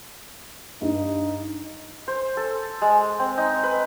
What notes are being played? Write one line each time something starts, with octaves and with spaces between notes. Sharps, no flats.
G2 D#4
C5
A4
G#3
C4
D#4
B4